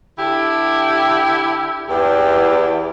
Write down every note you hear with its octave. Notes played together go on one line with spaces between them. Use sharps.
D3 E4 G4
E2 G4